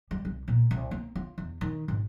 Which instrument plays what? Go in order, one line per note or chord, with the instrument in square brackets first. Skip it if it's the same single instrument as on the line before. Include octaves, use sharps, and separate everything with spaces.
[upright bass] G3
C2
A#2
C2
A#3
F4
E2
D#3
G#1